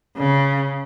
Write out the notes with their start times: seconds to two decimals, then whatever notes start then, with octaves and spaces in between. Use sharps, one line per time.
0.17 C#3